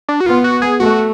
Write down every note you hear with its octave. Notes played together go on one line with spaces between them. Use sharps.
D4
F#4
B3 F4
F#4
G#4
A3 F#4